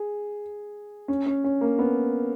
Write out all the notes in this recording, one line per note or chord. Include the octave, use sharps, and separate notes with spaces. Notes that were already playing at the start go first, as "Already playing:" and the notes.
Already playing: G#4
C#4
C#4
C#4
A#3
B3